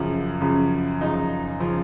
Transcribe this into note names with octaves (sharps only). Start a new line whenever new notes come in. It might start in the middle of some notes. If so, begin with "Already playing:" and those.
Already playing: F#2 C#3 F3
F#2 C#3 F3
F#2 C#3 F3 D#4
C#3 F3